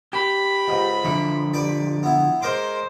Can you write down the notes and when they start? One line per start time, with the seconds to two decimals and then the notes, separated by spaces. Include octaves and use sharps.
0.13 G4 B5
0.68 C#2 G#2
1.05 D3 E3 F3
1.54 G4 B4 D5
2.03 B3 E4
2.42 G#3 A#4 C5 D6